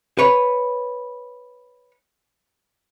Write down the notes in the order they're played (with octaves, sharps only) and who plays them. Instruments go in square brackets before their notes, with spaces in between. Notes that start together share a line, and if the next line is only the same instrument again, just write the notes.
[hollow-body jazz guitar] B4 C#5